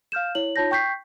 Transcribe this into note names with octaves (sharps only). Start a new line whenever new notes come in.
F5 F6 G6 E7
E4 C#5 F#7
D#4 F4 C#5 A5 G6 A#6
G5 C#6 G6 B6 C7